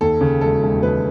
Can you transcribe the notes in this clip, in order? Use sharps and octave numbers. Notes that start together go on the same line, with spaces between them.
D#2 A4
C#3
E1 A4
E1
D#2 B4